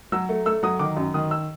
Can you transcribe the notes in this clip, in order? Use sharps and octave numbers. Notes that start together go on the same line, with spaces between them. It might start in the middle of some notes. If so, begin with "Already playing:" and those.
F#3 E6
A3
A3 E6
F#3 D#6
D#3 D6
F#2
D#3 D#6
E6